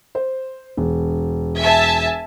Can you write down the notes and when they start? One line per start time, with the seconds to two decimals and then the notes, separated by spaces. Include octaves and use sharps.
0.15 C5
0.77 E1
1.59 E5 G#5 A5